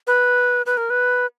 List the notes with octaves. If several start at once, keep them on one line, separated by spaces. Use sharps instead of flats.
B4
B4
A#4
B4